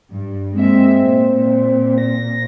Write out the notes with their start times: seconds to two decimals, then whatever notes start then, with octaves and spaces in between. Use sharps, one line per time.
0.11 G2
0.54 G#3 A#3 C4 E5
1.00 A#2
1.32 A#2
1.98 A#6